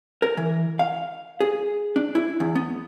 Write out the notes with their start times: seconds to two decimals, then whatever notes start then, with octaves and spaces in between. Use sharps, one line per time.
0.22 A#4
0.37 E3
0.79 F5
1.40 G#4
1.96 D4
2.15 E4
2.40 E2
2.55 B3